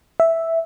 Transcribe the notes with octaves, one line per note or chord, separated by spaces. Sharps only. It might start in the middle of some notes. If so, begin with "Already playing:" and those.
E5